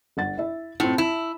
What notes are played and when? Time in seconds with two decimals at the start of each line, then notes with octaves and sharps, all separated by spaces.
0.17 G1 F#5 A6
0.38 E4 E5
0.80 A2 C4 F4
0.98 E4 A5